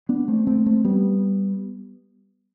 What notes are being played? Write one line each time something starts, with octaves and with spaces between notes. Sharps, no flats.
B3 D4
A3 C4
A3 C4
A3 C4
G3 B3